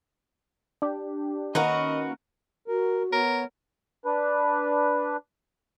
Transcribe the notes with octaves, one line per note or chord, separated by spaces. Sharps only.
D4 G4
D#3 A#3 C#4 F#4 A#4 B4 D#5
F#4 A#4
B3 A#4 C#5
D4 B4